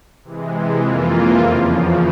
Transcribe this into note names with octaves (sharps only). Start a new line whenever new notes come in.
C3 E3 G#3
F2 E3 A#3 F4
E2 C#3 F3